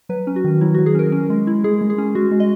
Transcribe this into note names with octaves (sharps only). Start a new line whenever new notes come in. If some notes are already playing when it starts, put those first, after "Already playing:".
F#3 B4
C#4
F#4
D#3
F#3 E4
F#3 F#4
G#4
C#4 A#4
C#4
G#3
E4
G#3 G#4
G#3
G#4
C#4
G#3 F#4
G#3
D#5